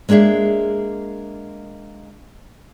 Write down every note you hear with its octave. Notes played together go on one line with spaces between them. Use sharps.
G#3 A#3 D4 G#4 E5